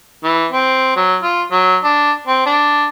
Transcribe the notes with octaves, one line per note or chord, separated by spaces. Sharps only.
E3
C4
F#3
F4
F#3
D4
C4
D4